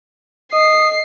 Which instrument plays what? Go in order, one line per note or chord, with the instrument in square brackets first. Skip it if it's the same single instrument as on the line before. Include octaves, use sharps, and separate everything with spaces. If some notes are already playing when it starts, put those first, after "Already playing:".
[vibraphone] D#5 [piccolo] D#6 [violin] C7